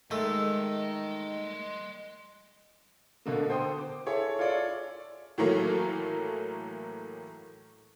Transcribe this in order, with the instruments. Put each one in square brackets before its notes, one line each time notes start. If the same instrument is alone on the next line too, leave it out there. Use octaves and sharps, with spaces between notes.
[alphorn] D#3 [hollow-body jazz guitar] G#3 [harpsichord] A3 [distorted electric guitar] D#5 C6
[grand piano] B2 D3 A#3
A4 C5 G5 C6 D#6
D6
E4 G#4 A4 C#5
F4 A4 C#5 D5
[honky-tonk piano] A2 E3 F#3 A3 A#3